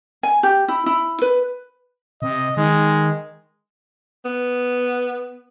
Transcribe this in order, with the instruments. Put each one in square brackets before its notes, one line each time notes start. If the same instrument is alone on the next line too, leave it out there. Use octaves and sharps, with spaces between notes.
[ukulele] G#5
G4
E4
E4
B4
[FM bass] C3 [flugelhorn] D#5
[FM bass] D#3 [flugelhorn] G#3
[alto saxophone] B3